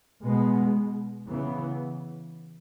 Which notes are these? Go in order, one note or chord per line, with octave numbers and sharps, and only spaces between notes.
B2 G#3 B3
C#3 E3 B3